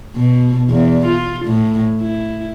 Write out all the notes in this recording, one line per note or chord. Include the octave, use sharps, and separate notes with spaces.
B2
E2
F4
A2
E4